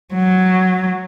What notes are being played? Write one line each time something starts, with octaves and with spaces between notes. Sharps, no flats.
F#3